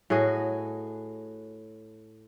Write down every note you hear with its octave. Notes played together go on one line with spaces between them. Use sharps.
A2 F#4 G#4 D#5